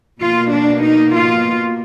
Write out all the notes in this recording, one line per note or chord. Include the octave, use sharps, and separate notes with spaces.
B2 A#3 F4
D4
D#4
F4